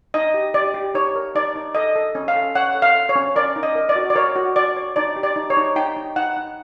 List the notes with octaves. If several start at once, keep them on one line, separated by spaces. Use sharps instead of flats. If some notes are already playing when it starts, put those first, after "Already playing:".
D#4 D#5
G4
G4 D5
G4
D#4 C#5
A#4
D#4 D5
D#4
A4 D#5
A4
C#4
F5
A4
C#5 F#5
A4
F5
A4
C#5
C#4
A#4 D5
D#4
D#5
A#4
D5
F#4
D5
A#4 C#5
F#4
F#4 D5
C#5
D#4 D5
G4
D5
D#4
C#5
D#4
D#4 G5
D#4
D#4 F#5
D#4